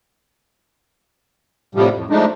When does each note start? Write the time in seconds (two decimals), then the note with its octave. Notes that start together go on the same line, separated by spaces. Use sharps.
1.75 A2 C3 F3 G3
1.95 F2 A2
2.10 F3 G#3 A3 D4 D#4